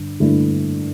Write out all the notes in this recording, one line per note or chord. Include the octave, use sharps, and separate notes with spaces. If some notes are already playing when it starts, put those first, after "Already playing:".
Already playing: G2 D3
G2 D3 A3 E4